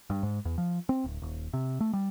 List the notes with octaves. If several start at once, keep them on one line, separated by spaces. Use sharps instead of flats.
G2
G#2
E2
F3
C4
D1
D#1
C3
A3
G3